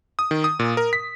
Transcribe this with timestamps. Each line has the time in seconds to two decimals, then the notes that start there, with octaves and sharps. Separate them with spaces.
0.19 D#6
0.31 D#3
0.44 D#6
0.59 A#2
0.77 A#4
0.93 B6